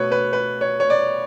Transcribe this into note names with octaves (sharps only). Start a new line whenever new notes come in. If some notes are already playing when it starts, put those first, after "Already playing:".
Already playing: B2 A3 B4 C#5
B4
B4
C#5
C#5
D5